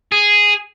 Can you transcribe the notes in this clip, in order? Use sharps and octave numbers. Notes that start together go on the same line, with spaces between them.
G#4